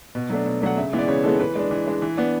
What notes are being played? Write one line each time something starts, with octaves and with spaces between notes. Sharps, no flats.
B2
F#3 A3 D4
B2
F#3 A3 D4 F#5
C#3 E5
E3 G#3 B3
D5
C#3 C#5
E3 G#3 B3 A4
E3 B4
G#3 D4
E3
G#3 D4
E3
B3 D4